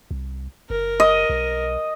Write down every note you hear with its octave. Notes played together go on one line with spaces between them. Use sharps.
C2
F#1 A#4
D#5
B1